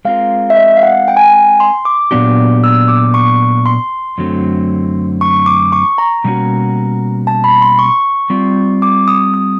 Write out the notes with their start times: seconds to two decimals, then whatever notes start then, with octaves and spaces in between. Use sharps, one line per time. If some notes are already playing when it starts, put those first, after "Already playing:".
0.05 G#3 C4 F4 A#4 F5
0.50 E5
0.57 D#5
0.77 F5
0.83 F#5
1.08 G5
1.17 G#5
1.25 G5
1.33 G#5
1.60 C6
1.85 D6
2.11 A#2 F#3 B3 D4 G4
2.64 E6
2.88 D6
3.14 C#6
3.66 C6
4.18 F#2 D3 F#3 A3 C4
5.21 C#6
5.46 D6
5.72 C#6
5.98 A#5
6.24 B2 G3 A#3 C#4 F#4
7.27 A5
7.44 B5
7.62 C6
7.79 C#6
8.30 G3 C4 F4
8.82 D6
9.08 D#6
9.34 D#6